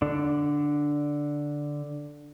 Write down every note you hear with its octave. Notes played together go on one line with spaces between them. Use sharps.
D3 D4